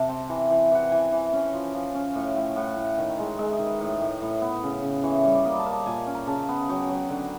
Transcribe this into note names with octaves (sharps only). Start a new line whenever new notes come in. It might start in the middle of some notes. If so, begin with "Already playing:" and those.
Already playing: C3 A5
C4 G5
E3
E3
E3 F#5
G5
E3 G#5
G5
E3
C#4
F3
F3
C#4
A2
A2 G5
A2 F#5
A2
D#3
G#3
G#3 E5
D#5
D#3
B4
A2
A2
A2
B3
C#3
C#3
E3 C#5
G3
D5
A#3 D#5
A5
A#3
A5
A#2 G#5
C#4
A#5
C#3 A5
B3
F#3 G5
G#5
F#3
G5
D3